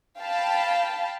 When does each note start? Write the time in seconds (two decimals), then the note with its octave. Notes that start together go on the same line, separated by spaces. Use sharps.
0.20 F5 G5 A5 B5